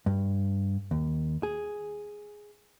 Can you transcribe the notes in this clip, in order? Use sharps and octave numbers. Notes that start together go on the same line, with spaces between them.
G2
D#2
G#4